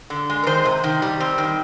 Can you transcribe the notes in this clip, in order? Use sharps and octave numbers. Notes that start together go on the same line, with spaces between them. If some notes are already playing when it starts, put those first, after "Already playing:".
D3
G#3
A#4
D#3 C5
C3
D#3
G3
C4
D#3